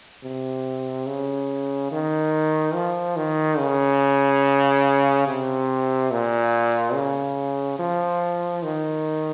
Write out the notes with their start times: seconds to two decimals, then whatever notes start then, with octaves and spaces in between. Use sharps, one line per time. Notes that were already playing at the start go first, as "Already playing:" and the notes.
0.24 C3
1.07 C#3
1.92 D#3
2.74 F3
3.16 D#3
3.58 C#3
5.27 C3
6.11 A#2
6.94 C#3
7.79 F3
8.63 D#3